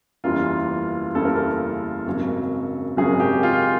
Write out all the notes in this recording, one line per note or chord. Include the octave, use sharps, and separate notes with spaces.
F#1 E2 C#3 E3 G3 F4
F#1 E2 C#3 E3 G3 A4
A#4
A4
G#1 F#2 C#3 F#3
G#1 F#2 C#3 F#3 G#4
G4
F4